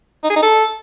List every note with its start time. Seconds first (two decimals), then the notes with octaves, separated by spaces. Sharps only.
0.24 D#4
0.30 G#4
0.36 D#4
0.43 A4